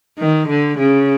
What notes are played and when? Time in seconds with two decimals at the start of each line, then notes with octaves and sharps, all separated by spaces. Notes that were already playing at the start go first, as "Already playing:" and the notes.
0.19 D#3
0.49 D3
0.79 C#3